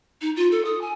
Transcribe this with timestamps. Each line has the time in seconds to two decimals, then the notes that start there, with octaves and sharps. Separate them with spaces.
0.22 D#4
0.36 F4
0.51 A4
0.65 D#6
0.81 G#5